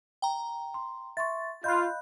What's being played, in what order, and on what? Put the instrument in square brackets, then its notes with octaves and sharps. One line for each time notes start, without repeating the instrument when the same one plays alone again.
[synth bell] G5 A#5
[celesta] C6
[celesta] E5 C6 C#6 [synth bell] A6
[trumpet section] F4 [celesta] D#5 F5 B5 [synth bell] F#6 G6